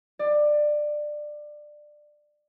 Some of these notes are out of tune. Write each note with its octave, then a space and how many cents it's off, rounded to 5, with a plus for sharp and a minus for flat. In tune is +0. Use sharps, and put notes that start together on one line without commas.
D5 +20